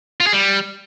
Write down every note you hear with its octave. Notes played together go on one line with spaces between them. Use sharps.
F4
G#4
G3